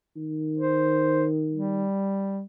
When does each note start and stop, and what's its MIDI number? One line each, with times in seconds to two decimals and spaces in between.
0.16 1.86 51
0.58 1.26 72
1.52 2.43 55